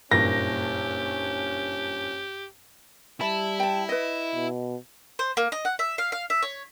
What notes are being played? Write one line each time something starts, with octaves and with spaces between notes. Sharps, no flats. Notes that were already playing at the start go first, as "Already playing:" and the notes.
F#1 G2 A#2 C#4 G4 A#6
G3 E4 A5
G5 A5
B4 D#5
B2
C5
A#3
D#5
F#5
E5
F5
F5
E5
C#5